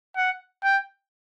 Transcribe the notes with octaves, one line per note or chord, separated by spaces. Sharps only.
F#5
G5